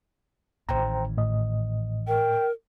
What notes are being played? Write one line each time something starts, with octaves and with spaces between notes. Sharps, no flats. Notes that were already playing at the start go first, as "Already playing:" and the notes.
A1 D#3 C5 G5 A#5
A2 D#5
A#4 G5